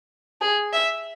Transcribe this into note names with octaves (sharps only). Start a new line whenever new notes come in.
G#4
E5